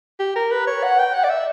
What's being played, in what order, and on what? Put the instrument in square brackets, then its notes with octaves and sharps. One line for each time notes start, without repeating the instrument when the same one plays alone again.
[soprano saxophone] G4
A#4
B4
C#5
F#5
G5
F#5
D5
E5